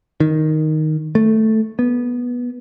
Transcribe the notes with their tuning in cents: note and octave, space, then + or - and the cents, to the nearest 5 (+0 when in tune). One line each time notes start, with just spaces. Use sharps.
D#3 +0
A3 +0
B3 -15